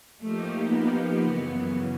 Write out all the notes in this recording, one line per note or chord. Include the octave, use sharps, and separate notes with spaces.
F3 A3 A#3 D#4 G4
B3
F#2 C#3 E3